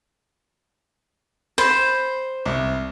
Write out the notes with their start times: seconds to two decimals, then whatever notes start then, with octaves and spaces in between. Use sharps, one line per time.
1.58 C5 B5
2.45 C2